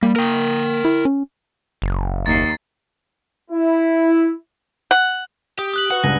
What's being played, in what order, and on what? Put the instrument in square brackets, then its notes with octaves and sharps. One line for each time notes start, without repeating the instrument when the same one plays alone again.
[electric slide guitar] G3 [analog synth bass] A#3
[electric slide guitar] A#4 G5
[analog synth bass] E4
C#4
[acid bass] F#1
[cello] D#2 [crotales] A6 C7
[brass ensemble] E4
[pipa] F#5
[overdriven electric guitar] G4 [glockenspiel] D#6
[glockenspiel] D#6 F#6 F#7
[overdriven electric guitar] F#4 [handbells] B4 F#5
[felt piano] C#2 G2 [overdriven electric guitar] G#5 [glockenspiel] A#6